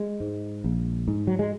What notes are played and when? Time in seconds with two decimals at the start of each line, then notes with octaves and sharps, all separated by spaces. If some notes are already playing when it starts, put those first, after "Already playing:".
Already playing: G#3
0.20 G#2
0.64 A#1
1.08 G#2
1.27 F#3
1.39 G#3